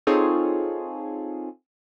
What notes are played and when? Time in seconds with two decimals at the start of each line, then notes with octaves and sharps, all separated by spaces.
0.07 C4 D#4 F4 G#4 A4 C#5